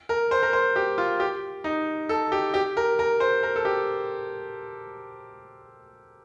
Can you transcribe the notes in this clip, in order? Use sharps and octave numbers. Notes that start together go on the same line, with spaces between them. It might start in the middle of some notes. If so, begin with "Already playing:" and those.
A#4
C5
A#4
C5
G4
F4
G4
D#4
A4
G4
G4
A#4
A#4
C5
A#4
A4
G4